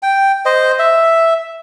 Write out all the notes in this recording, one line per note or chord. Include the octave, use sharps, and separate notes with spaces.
G5
C5 D#5
E5